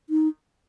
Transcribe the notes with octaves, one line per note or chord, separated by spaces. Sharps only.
D#4